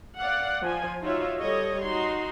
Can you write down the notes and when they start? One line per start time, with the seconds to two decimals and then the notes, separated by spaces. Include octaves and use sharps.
0.19 D5 F5 F#5
0.63 F3 G#5
1.02 D#4 F4 F#4 C#5 E5
1.38 G3 A4 C#5 D#5
1.84 D#4 F#4 C6